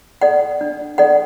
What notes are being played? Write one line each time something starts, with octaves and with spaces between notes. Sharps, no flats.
A4 D5 F#5
D4
A4 D5 F#5